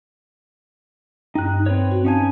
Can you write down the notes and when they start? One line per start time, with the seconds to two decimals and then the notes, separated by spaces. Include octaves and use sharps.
1.35 G2 D#4 G5 F#6
1.66 C4 B4 C#5
1.91 F#4
2.05 C#4 D#4 F5 G#5 A5 G#6